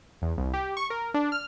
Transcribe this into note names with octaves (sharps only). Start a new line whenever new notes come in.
E2
C2
G4
C#6
A#4
D4
F6